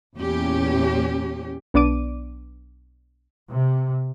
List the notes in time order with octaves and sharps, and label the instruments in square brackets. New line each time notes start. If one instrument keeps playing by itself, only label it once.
[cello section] E2 A#2 C#4 G4
[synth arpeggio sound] B1 B3 D4 D5 D6 D#7
[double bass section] C3